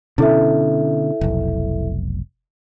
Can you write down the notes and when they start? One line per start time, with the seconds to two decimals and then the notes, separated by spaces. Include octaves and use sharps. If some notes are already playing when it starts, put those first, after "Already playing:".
0.18 B2 D3 C#4 E4 A4 E5
1.21 F1 B1